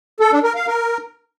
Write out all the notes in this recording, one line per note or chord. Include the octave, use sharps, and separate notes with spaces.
A4
D4
A#4
F5
A#4